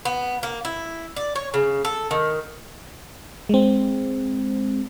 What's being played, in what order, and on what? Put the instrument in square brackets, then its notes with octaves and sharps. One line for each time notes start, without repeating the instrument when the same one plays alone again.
[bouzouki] B3
A#3
E4
D5
C#5
C#3
A4
D#3
[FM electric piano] G#3 C4